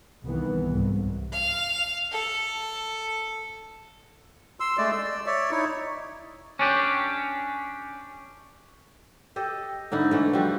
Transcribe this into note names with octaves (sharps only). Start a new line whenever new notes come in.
C2 D#3 E3 B3
C2 G#2
F5
A4
C6 E6
G#3 A3 D5
E6
D5
C#5 D5 E5
D#4 E4 C#5
C#4 D4 G4
G4 A4 D#5
G#2 D3 D#4 E4
D3 E3 A3
F3 G3 F#4